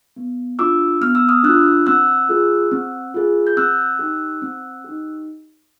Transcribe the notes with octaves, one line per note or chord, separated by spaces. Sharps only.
B3
D4 F4 D6 E6
B3 F6
E6
D#6 F6
D4 F4 E6 F#6
C4 E6 F#6
F4 G#4
C4
F4 G#4
G6
C4 E6 F#6
D#4 G4
C4
D#4 G4